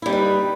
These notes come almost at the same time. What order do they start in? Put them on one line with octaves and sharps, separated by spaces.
E4 G3 D#4 B4